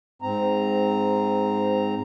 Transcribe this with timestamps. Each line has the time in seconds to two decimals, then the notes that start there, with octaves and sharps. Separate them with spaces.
0.22 G#2 C4 A#5